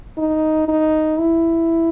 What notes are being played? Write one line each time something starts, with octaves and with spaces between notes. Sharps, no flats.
D#4
D#4
E4